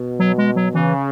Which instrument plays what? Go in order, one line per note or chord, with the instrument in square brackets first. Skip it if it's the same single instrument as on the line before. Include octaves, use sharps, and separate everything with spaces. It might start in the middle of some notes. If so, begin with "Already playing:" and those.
Already playing: [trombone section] B2
[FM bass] F#3
G#3
F#3
[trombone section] C#3 [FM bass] E3